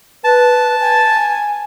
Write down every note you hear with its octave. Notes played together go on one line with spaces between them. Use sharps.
B4 A5
G#5